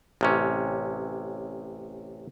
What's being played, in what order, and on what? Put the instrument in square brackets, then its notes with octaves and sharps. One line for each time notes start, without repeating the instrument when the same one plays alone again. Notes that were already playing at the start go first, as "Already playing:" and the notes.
[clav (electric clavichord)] A1 C3 C#4